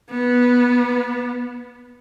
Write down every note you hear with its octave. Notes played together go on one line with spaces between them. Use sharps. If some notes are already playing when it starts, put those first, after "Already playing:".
B3